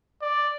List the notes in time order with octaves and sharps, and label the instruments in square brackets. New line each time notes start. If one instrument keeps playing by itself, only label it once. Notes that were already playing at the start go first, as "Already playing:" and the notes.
[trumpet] D5